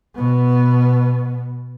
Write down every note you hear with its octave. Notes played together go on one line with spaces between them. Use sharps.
B2 B3